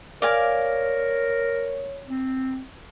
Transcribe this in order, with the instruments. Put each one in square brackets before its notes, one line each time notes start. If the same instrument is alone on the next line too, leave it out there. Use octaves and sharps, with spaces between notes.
[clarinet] A#4 [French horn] C#5 [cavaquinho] D5 F5 G#5
[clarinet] C4